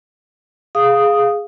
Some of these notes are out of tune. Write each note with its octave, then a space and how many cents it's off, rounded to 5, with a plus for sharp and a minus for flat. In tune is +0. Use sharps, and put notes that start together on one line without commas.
G#4 +0 F5 +5 D#6 +0